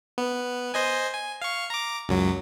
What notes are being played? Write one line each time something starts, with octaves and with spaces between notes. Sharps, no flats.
B3
C5 D#5 G#5
G#5
F5 C#6
A#5 D6
C#2 F#2 F#3